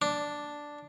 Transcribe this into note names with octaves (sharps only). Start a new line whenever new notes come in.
D4